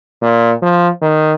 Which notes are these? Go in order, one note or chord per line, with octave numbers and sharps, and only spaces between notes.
A#2
F3
D#3